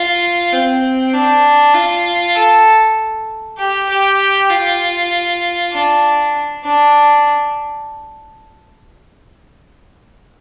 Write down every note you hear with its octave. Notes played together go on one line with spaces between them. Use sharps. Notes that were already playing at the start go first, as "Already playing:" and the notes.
Already playing: F4
C4
D4
F4
A4
G4
G4
F4
D4
D4